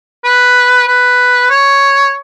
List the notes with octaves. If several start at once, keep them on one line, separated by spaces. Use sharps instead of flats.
B4
B4
C#5